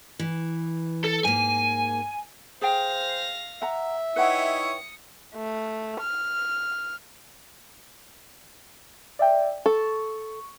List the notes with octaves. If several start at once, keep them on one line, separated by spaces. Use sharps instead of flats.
E3
A4
G#2 A#3 G#5
G#4 C5 F5 G5 A#6
E5 F#5 A#5
D#4 E4 B4 C#5 F#5 G5 D#6 C#7
A3
F6
D5 E5 G5
A4 C#6